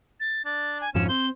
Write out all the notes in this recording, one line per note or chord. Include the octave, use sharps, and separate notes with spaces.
A6
D4 A6
G#5
F2 G#2 F3 C#4 E7
C4 C5 G7